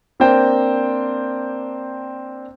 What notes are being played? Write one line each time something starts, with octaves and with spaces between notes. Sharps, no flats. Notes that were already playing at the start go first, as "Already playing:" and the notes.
A#3 C4 D4 A#4 C5 G5